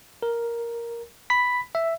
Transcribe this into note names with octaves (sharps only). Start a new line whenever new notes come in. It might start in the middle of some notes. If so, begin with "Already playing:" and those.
A#4
B5 B6
E5